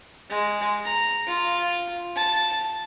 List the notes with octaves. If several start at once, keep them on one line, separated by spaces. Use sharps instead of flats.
G#3
A#5
F4
A5